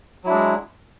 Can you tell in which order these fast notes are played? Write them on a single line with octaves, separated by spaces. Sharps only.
F#3 E4 D4 G#3